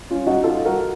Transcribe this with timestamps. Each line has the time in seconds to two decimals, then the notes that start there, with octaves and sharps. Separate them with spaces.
0.11 C#4 F4
0.27 D#4 F#4
0.44 F4 A4
0.65 F#4 A#4